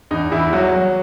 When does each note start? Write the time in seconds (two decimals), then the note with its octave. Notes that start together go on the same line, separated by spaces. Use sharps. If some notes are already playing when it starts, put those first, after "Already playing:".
0.11 E2 D#4
0.32 E2 E4
0.53 F#3 F#4
0.75 F#3